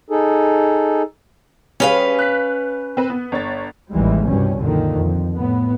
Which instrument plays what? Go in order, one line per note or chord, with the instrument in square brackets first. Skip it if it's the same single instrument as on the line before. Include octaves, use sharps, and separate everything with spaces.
[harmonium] D#4 G#4 A4
[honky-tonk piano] G3 G#4 [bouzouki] C#4 B4 F5
[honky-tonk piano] F#6 B6
C4 B4
B3
G1 C#5 A6
[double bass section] A1 D#2 E3 G3 G#3
C2 G2 B2 G3 C#4
F#2 A#2 D3 D#3
F2
A2 B3